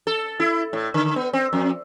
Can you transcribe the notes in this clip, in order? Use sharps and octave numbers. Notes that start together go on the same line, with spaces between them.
A4
E4
A2
D3
B3
C4
F2